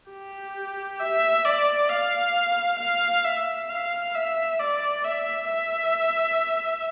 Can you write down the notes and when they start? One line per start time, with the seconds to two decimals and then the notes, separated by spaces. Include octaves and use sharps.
0.10 G4
1.00 E5
1.45 D5
1.90 F5
2.80 F5
3.25 E5
3.69 F5
4.15 E5
4.59 D5
5.04 E5
5.49 E5